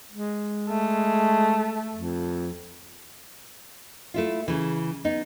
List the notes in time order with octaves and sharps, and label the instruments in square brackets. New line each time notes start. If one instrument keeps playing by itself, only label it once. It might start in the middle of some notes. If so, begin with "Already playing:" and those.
[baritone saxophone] G#3
[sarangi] A3
[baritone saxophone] F2
[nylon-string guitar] A3 E4 F4
C#3 E3
B3 D#4